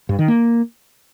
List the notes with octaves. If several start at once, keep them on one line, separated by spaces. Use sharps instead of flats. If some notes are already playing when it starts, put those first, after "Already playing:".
G2
D#3
A#3